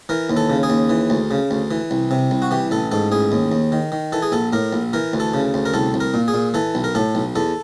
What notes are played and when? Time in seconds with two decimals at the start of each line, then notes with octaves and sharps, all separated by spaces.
0.09 E3 A#4
0.30 D#2
0.37 A4
0.50 C#3
0.63 G#4
0.70 D#2
0.90 E3
1.10 D2
1.31 C#3
1.51 D2
1.71 E3
1.91 C2
2.11 C3
2.31 C2
2.42 F#4
2.51 E3 G4
2.71 A1 A4
2.92 G#2 A4
3.12 A1 G#4
3.32 D#2
3.52 D#2
3.72 D#3
3.92 D#3
4.12 E3 A4
4.22 G#4
4.32 A#1 A4
4.53 A2 A#4
4.73 A#1
4.93 E3 A#4
5.13 D2
5.20 A4
5.34 C#3
5.54 D2
5.66 A#4
5.74 C2 A4
5.94 C2
6.00 A#4
6.14 A#2
6.28 G#4
6.34 A#2
6.54 E3 A4
6.75 B1
6.84 A#4
6.95 A2 A4
7.15 B1
7.36 E2 A4